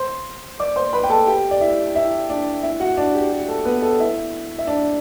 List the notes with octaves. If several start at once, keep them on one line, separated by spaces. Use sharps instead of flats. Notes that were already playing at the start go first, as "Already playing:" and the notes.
Already playing: C5 C6
D5 D6
C5 C6
B4 B5
G5
A4 A5
G4 G5
D5
E4 E5
E4 E5
D4 D5
E4 E5
F#4 F#5
D4 D5
G4
G4
A4
B3 B4
A4
E4 E5
E5
D4 D5